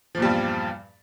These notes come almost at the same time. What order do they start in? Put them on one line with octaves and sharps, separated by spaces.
F3 A#2 E2 G3 G2